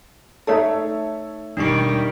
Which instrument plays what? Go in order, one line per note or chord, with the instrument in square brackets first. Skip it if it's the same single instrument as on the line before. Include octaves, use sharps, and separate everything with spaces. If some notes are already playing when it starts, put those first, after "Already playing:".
[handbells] A3 D#4 A5 [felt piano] A4 C#5 E5
[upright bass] E1 [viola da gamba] D#3 G3 [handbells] D4 D#4 C#6